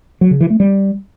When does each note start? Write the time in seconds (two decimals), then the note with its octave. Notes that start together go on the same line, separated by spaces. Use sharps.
0.21 F#3
0.31 C#3
0.41 E3
0.50 A3
0.60 G3